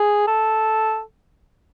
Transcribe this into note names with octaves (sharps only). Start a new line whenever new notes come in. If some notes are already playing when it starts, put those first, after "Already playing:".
Already playing: G#4
A4